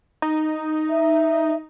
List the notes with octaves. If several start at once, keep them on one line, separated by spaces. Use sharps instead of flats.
D#4
E5